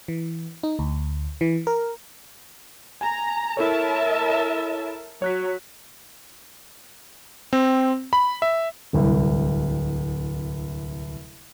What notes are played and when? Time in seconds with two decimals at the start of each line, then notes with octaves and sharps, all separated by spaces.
0.08 E3
0.63 D#4
0.79 D2
1.41 E3
1.67 A#4
3.01 G#5 A#5
3.57 E4 A4 A#4 C#5 E5 A5
5.22 F#3 C#5 F#6 B6
7.53 C4
8.13 B5
8.42 E5
8.93 D1 C2